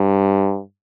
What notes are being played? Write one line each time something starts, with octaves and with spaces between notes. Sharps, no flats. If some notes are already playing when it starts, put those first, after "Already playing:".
Already playing: G2